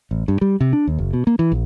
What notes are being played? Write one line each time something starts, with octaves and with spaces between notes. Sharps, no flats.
A1
G2
G3
C3
D4
D#2
F#1
B2
A#3
E3
A#1